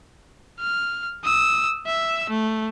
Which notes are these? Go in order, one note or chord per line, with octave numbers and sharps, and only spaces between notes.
F6
D#6 E6
E5 E6
A3